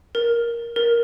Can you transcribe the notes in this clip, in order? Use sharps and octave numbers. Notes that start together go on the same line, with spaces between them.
A#4
A#4